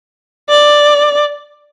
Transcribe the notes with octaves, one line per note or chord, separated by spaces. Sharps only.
D5